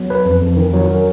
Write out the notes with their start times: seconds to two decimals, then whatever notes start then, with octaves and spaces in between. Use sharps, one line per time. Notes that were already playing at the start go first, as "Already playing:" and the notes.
Already playing: F#3 B3
0.10 B4
0.26 F2
0.41 F2
0.57 D#3
0.74 F#3
0.90 A#4